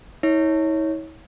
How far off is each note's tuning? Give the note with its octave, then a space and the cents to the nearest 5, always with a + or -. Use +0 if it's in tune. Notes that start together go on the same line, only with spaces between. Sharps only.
E4 -45 C#5 +0